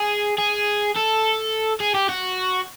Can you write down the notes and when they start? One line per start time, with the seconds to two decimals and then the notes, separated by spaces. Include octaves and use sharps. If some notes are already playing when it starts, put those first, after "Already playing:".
Already playing: G#4
0.38 G#4
0.96 A4
1.80 G#4
1.94 G4
2.09 F#4